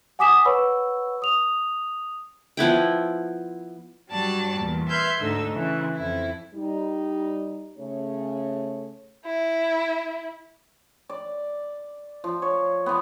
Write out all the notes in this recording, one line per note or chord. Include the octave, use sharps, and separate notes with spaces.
F#5 G#5 D6 D#6 B6 E7
B4 C#5 F#5 B5 C#6 E6
D#6 F7
F3 B3 E4 G5
G2 F#3 G3 D5 A5
E2 A#2
B4 E5 C6 F6 G6 G#6
D2 G#2 D3 D#4 E6
C#3 E3
F2 E4
G3 D#4
C#3 A3 C#5
E4
D5
F3
C#5
F3 B3